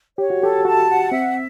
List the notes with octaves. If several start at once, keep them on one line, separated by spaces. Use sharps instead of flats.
G4 C#5
F#4
G4 A4
F#4 A5
F#5
C4 E5